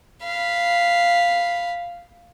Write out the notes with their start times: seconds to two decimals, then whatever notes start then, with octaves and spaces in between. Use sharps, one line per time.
0.23 F5 B5